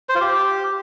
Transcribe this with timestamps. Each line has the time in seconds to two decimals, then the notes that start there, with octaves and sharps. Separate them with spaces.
0.09 C5
0.15 F4
0.21 G4